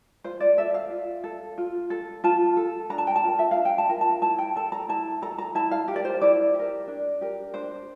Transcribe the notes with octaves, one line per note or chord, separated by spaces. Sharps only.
F4 C5
D5
A4 E5
F5
F4
A4
F4
A4
F4 A5
A4
D4 A#5
A5
G5
A5
F4 A#4
E5
D4 F5
G5
A5
F4 A#4
A5
E4 A5
G5
A4 A5
A#5
E4 A5
A4 A#5
A#5
E4 A5
F5
G4
A#4 D5
C5
E4 D5
G4
A#4
D4
G4 A#4
D4 C5